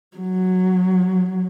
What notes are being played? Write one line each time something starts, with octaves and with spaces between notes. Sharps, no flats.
F#3